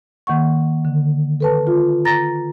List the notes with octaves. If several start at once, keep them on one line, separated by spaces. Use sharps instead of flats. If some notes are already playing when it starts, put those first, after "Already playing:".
D#3 A#3 F#5 C#6
D3
A4 B4 A5
F4
A#5 A6 A#6